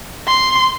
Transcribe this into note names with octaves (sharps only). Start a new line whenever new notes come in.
C6